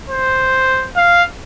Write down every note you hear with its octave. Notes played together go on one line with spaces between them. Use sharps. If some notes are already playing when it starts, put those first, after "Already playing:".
C5
F5